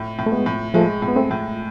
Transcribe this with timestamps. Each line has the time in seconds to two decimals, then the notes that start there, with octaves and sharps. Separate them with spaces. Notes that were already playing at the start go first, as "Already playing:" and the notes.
Already playing: A2
0.19 A2
0.26 A3
0.32 G#3 B3
0.46 A2
0.74 F3 G#3 A3
1.02 A2
1.08 B3
1.16 A3 C4
1.31 A2